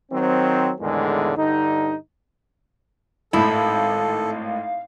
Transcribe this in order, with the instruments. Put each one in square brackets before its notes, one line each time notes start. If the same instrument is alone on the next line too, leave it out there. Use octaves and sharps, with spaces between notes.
[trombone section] D#3 F#3 C4
E2 A2 D3 D#3 G#3
G2 D3 D#4
[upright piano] G#1 A2 [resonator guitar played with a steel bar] E4 [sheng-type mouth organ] A4 [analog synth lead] F5